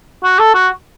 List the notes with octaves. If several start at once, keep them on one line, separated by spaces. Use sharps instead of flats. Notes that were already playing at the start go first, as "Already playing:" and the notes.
F#4
A4
F#4